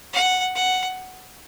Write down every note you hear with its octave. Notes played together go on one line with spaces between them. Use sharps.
F#5
F#5